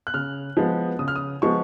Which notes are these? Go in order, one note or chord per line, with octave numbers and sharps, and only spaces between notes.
F#6
C#3 F6
F3 G#3 B3
C#3 D#6
F6
D#6
F3 G#3 B3 C#6